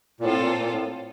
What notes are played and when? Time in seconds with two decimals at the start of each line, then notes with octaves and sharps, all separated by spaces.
0.20 A#2
0.24 A2 C4 F4 A4
0.40 A#2
0.57 A#2
0.73 A2